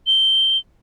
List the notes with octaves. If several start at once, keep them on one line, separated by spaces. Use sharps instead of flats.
G7